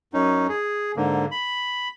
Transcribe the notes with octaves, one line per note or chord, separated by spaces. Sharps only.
F#2 C#4 D#4
G#4
G#2 D3 A#3
B5